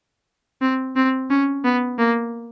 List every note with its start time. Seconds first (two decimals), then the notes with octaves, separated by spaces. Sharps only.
0.62 C4
0.96 C4
1.30 C#4
1.65 B3
1.99 A#3